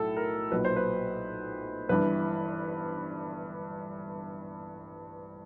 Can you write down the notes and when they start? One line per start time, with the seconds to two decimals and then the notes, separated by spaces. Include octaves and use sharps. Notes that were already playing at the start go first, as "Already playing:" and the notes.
Already playing: B1 A2 F#3 A4
0.17 A#4
0.51 B1 A#2 F#3 B4
0.65 C5
0.76 B4
1.89 G1 G2 E3 B4